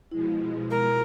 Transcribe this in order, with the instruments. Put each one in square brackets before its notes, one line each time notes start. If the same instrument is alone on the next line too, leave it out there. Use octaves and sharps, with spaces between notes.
[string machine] B2 F3 G#3 [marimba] E4
[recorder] A#4